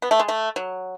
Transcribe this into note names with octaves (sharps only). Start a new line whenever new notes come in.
B3
A3
G#3
A3
F#3